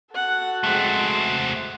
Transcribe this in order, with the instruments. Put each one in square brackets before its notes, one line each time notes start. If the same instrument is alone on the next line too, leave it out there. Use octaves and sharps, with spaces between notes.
[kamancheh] F#4 A4 [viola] F#5
[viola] G#3 F#5 [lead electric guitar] A3 C4